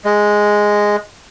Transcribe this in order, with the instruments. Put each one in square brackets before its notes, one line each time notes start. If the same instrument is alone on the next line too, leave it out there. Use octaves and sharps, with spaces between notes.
[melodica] G#3